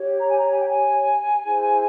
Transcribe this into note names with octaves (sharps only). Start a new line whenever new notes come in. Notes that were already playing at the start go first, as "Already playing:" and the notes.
Already playing: G4 C#5
A#5
G#5
A#5
G#5
G5
G#5
E4 G#4 C5